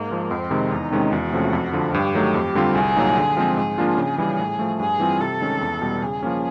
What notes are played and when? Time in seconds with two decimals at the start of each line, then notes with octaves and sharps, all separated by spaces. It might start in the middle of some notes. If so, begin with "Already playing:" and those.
Already playing: G#2 A#3
0.11 F3 G#3
0.31 F2 C4
0.51 C3 D#3 G#3
0.72 E2 D#4
0.92 C3 D#3 G#3 C#4
1.12 E2 F#4
1.33 C3 F3 A3 C#4
1.53 F2
1.73 D3 F3
1.94 G2 G4
2.14 D#3 F#3 A3
2.34 F2
2.55 D3 G3 C4 F4
2.75 C2 G#4
2.96 A#2 F#3 A#3 D#4
3.17 D3
3.37 F3 G#3 C4
3.57 G#2 G#4
3.78 F3 A#3 D4 F4
3.97 C#3
4.18 E3 G3
4.39 A2
4.59 F3 A3
4.80 G2 G#4
4.99 E3 G3 C4 F4
5.20 C3 A4
5.41 D#3 G#3 C#4
5.61 E2
5.82 B2 G3
6.02 C#3 G#4
6.23 F3 A#3 C#4